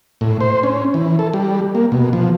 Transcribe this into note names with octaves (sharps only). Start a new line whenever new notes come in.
A2
C5
C#4
E3
A4
G3
A#3
B2
F3